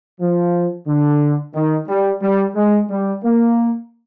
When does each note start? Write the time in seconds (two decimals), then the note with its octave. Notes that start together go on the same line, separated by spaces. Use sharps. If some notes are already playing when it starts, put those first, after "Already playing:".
0.20 F3
0.87 D3
1.54 D#3
1.87 G3
2.21 G3
2.55 G#3
2.89 G3
3.23 A#3